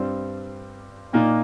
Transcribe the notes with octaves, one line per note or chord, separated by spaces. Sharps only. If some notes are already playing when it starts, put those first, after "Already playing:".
Already playing: G2 G3 C4
A#2 A#3 D#4